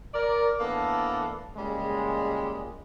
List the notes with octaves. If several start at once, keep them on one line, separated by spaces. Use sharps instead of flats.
A#4 D5
A2 E3 A#3 B3 D4 A4
A#2 C#3 G3 G#3